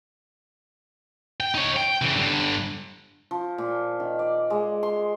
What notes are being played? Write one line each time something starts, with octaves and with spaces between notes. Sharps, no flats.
G5
D#4 C#5
G5
C#3 E3
G2 D3
F3
A#2
D#3
D5
G#3
C6